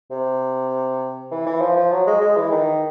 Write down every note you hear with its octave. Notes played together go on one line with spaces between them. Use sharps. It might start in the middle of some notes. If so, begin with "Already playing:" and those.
C3
E3
E3
F3
F3
F#3
G#3
G#3
E3
D#3